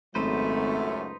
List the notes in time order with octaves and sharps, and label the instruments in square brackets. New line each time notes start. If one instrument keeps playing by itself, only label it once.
[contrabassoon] G#1 [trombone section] C#2 F#2 F#3 [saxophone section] A3 [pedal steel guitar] D#4 B4 C5